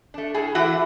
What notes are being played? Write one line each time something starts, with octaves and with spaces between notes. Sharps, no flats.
A3 D4
A2 G#4
E3 A3 E4 F#4